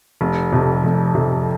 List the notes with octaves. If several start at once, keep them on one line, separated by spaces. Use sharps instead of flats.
F1
F2 C3
F1
F2 C3